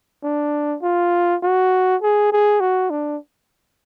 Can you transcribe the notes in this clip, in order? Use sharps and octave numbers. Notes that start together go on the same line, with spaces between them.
D4
F4
F#4
G#4
G#4
F#4
D4